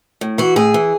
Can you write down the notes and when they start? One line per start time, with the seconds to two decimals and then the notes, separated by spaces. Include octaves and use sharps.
0.21 A2
0.38 E3 F#4
0.56 A2 G#4
0.74 E3